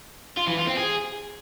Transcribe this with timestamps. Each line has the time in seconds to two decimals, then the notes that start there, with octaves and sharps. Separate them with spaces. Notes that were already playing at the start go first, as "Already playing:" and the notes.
0.37 F4
0.47 E3
0.57 F4
0.67 C4
0.77 G#4